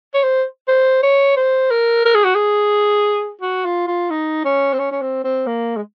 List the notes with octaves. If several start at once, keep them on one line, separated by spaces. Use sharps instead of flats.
C#5
C5
C5
C#5
C5
A#4
A#4
G#4
F#4
G#4
F#4
F4
F4
D#4
C#4
C4
C#4
C#4
C4
C4
A#3
G#3